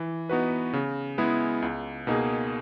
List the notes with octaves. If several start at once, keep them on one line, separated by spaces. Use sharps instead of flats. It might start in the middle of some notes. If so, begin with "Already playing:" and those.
Already playing: E3
B3 D#4 F#4 B4
C#3
G#3 B3 E4 G#4
C#2
B2 A#3 D#4 G#4